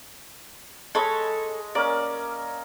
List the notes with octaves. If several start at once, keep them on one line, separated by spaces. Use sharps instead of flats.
G#3 A4 C#5 D#5 B5
A#3 C#4 A#4 D5